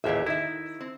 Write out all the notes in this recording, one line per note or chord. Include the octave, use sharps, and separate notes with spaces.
A1 D#2 A#2 G4 G#4 E5
D#3 E4 E5
C4